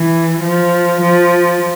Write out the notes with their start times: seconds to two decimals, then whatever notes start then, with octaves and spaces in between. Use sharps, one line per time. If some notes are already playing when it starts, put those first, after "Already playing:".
Already playing: E3
0.42 F3
1.00 F3